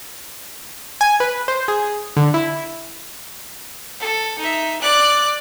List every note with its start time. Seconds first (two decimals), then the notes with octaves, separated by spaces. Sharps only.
1.01 G#5
1.20 B4
1.48 C5
1.68 G#4
2.17 D3
2.34 E4
4.00 A4
4.38 D#4 E5
4.81 D5 F#6